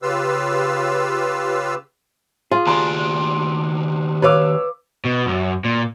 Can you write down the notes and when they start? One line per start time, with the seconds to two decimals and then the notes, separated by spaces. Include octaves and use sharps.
0.02 C#3 F4 G4 B4 F5 E6
2.51 F4 G#4
2.67 D#2 D4 G#5 A#5 C6
4.22 B4 C#5 F5 D6 E6
5.05 B2
5.27 F#2
5.64 A#2